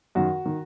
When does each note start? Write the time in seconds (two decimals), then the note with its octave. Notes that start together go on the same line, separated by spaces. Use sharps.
0.15 F#2 D#3 F#4
0.46 D#3